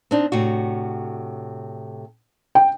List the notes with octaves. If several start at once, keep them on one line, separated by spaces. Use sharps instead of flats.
C4 D4 D#4
A2 C3 F#4
G5